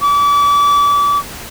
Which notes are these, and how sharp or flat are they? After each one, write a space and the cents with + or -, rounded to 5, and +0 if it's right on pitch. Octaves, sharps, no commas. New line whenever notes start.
D6 -35